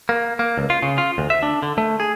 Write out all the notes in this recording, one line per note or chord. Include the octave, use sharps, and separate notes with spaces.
A#3
A#3
C#2
F4
C#3
F4
D2
E5
D4
D3
A3
G#4